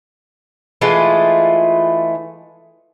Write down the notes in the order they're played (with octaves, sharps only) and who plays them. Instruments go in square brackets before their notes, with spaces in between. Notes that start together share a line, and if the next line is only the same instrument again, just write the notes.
[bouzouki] E3 G#3 A3 F4